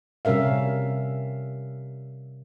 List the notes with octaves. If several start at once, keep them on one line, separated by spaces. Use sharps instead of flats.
C3 G3 C#4 A#4 E5 F5